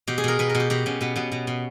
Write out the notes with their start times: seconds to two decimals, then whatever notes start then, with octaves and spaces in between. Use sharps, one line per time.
0.07 B2 G4
0.18 G#4
0.24 B2 A#4
0.39 B2 B4
0.50 A#4
0.55 B2
0.60 G4
0.70 B2 G4
0.86 B2 C#4
1.01 B2 B3
1.16 B2 B3
1.32 B2
1.47 B2